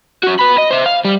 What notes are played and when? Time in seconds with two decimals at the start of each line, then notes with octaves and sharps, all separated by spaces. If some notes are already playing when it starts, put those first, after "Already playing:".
0.24 C#4 F#4
0.39 B3 B5
0.58 D#5
0.71 C5 E5
0.86 F5
1.05 G3